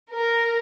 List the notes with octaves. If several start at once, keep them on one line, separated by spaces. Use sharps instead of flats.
A#4